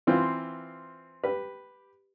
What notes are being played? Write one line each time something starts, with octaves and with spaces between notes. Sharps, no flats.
E3 C4 F4 C5
G4 B4